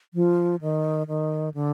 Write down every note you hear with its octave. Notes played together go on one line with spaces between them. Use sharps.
F3
D#3
D#3
D3